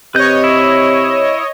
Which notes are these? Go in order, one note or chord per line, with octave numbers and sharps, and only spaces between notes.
C3 B4 C#5 D#5 G6
E4